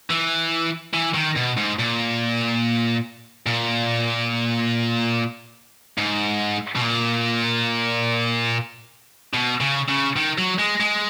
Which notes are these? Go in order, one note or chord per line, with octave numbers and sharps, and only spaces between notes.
E3
E3
D#3
B2
G#2
A#2
A#2
G#2
B2
A#2
B2
C#3
C#3
D#3
F#3
G#3
G#3